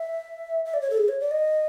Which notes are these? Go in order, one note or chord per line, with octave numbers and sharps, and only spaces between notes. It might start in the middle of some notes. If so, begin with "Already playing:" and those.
Already playing: E5
E5
D5
C#5
A4
G#4
C#5
D5
D#5